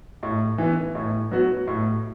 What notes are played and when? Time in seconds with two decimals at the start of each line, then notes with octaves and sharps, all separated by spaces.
0.23 A2
0.58 E3 B3
0.95 A2
1.31 F#3 B3 F#4
1.67 A2